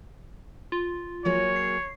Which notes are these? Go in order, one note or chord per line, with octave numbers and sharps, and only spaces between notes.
F4
F#3 A#3 G#4 C#5
C7